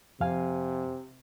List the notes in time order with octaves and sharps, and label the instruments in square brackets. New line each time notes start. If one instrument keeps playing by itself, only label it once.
[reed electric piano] F2 F5 G#5 [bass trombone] C3